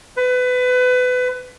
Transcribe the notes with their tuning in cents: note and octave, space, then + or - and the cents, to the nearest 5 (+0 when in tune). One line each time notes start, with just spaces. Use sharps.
B4 +25